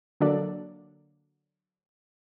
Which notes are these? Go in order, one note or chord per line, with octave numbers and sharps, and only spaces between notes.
D3 F#3 A#3 D4 A4 D5